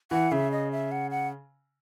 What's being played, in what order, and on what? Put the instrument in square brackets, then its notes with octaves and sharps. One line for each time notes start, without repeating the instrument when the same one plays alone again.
[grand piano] E3 [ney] F#5
[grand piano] C#3 [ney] E5
[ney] D#5
E5
F#5
F#5